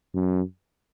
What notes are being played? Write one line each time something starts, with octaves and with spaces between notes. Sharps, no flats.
F#2